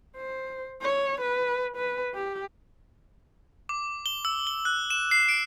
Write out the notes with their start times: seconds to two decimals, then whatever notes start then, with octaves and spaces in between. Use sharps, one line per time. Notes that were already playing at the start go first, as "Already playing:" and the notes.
0.16 C5
0.82 C#5
1.21 B4
1.77 B4
2.14 G4
3.69 D6
4.06 G7
4.25 E6
4.47 G7
4.65 F#6
4.90 E7
5.11 C7
5.29 D7